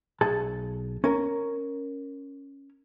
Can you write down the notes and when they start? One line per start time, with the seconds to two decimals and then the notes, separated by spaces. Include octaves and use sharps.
0.21 B1 G#4 A5
1.04 C#4 A#4